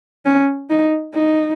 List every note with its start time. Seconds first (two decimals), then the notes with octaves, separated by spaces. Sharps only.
0.26 C#4
0.70 D#4
1.14 D#4